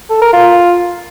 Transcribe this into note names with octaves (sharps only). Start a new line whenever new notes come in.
A4
A#4
F4